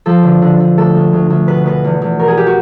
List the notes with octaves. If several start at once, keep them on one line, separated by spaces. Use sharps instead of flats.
F3 A4
D3
D3
D3
D2 A4
D2
D2
D2
B2 B4
B2 B4
E2
E2
B2 A#4
G#4
G4
F#4